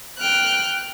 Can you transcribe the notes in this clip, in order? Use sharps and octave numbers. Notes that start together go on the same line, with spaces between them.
G5 F6 F#6